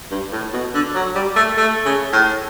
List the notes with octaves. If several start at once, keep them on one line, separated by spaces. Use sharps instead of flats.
G2
A2
B2
D3
F#3
G3
A3
A3
C#3
A2